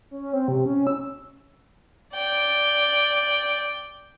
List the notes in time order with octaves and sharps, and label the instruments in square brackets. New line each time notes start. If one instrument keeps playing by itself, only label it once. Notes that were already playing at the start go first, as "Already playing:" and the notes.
[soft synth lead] C#4
C4
C3
C#4
E6
[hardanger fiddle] D5 G5